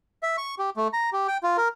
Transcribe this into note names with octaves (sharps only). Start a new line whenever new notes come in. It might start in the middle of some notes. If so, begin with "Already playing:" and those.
E5
C#6
G4
A3
A#5
G4
G5
F4
A#4